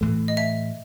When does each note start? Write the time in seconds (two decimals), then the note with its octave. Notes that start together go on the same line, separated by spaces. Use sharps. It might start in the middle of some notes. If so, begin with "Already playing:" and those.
0.01 A2 E3 A3
0.28 D#5
0.37 E5